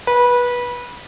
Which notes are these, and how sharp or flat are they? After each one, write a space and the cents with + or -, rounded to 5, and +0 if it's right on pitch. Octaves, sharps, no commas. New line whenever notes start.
B4 -20